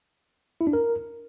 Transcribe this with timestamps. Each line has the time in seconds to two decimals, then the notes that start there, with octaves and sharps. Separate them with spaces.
0.61 E4
0.67 D4
0.73 A#4